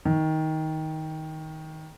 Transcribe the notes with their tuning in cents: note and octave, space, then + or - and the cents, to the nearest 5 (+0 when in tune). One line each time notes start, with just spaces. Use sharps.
D#3 +15